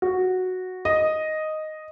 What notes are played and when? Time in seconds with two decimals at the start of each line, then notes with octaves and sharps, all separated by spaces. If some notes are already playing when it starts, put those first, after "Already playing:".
0.02 F#4
0.85 D#5